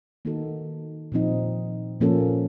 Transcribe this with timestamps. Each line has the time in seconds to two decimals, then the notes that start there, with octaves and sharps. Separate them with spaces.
0.25 D#3 A#3 D#4 F#4 A4
1.12 A#2 F3 C4 D#4
2.00 A#2 F3 A#3 C#4 A4